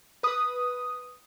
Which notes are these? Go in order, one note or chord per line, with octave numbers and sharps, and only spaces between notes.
B4 D#6